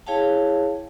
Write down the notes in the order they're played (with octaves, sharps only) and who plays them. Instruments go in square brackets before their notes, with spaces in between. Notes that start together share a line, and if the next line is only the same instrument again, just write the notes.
[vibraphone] E4 G#4 C#5 F5 G5 A5